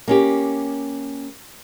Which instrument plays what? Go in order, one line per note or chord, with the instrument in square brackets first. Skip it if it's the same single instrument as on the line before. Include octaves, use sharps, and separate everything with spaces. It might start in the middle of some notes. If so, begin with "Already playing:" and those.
[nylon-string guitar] A#3 C#4 G4